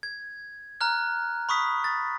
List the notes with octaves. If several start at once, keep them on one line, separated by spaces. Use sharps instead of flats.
G#6
A#5 F6 F#6
B5 C#6 D#6 B6
A6